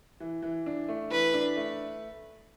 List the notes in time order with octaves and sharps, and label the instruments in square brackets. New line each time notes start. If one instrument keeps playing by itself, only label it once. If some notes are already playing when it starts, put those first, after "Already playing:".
[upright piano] E3
E3
D4
A3
[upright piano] E3 [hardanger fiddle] B4
[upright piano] D4
A3